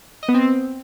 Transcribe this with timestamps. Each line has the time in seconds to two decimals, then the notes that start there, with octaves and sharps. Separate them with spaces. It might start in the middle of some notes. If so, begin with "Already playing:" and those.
0.23 D#5
0.29 B3
0.34 C4